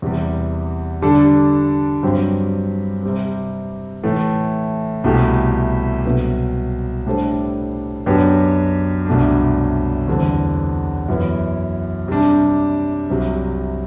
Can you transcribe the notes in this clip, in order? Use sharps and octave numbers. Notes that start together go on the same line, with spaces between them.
E2 C3 G3
D3 G3 D4 A4
G2 F#3 C4 G4
C3 G3 C4
A2 E3 A3
C2 B2 A3 E4 G4
C2 B2 F#3 B3
A2 G3 D4 A4 C5
F#2 F#3 B3 D4 G4
C2 B2 A3 D4
E2 D3 G3 C4
F#2 E3 B3 E4
C3 G3 D4
C2 C3 F#3